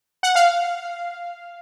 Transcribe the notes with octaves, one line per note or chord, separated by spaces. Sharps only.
F#5
F5